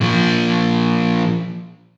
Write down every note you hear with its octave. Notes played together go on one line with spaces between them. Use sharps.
A#2 F3